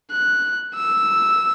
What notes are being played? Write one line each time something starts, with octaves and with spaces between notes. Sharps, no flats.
F#6
E6